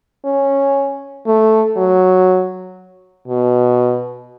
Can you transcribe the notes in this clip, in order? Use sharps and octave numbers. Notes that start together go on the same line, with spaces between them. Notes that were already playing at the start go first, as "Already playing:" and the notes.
C#4
A3
F#3
B2